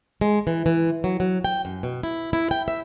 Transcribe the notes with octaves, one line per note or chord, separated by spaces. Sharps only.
G#3
E3
E3
F#3
F#3
G5
F#2
B2
E4
E4
G5
E5